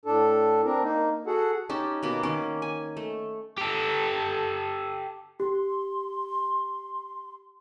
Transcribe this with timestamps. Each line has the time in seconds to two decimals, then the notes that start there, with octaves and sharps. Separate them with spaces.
0.05 A2 D4 A4
0.64 C4 D4 A#4
0.82 A#3 D#4
1.26 F#4 G#4 A4 F#5
1.70 C#4 D#4 G4 A5
2.03 B2 A#3 B5
2.23 D#3 A#3 C#4 D6
2.62 G#5
2.97 A3
3.58 G4 A4
5.40 G4 C6